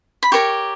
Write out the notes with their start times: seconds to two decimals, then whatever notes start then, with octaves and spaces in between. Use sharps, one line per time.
0.23 B5
0.32 G4 A#4 C#5 C#6